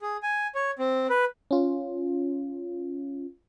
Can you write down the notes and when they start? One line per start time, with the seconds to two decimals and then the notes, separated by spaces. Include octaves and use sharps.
0.02 G#4
0.23 G#5
0.55 C#5
0.79 C4
1.10 B4
1.51 C#4 F4